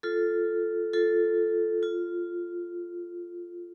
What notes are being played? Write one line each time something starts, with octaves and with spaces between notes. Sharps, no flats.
F4 A4
F4 A4
F4